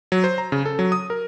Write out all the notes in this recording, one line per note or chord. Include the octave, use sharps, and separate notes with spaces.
F#3
C5
A#5
C#3
A4
F#3
D#6
A#4